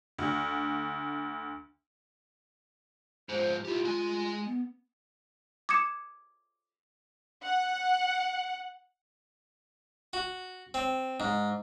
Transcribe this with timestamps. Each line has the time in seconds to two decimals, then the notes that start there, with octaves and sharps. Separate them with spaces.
0.18 D2
3.29 G#2 F3 C5
3.65 E4 F4 G4
3.85 G#3 G#5
4.45 B3
5.69 D6 D#6 G#6 C#7 E7
7.43 F#5
10.13 F#4
10.74 C4
11.20 G#2